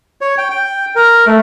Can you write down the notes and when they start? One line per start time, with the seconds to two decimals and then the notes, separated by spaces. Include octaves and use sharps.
0.21 C#5
0.38 G5
0.50 G5
0.96 A#4
1.27 A3